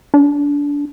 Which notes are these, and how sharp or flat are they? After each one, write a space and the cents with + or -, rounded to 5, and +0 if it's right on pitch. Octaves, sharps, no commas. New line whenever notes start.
D4 -25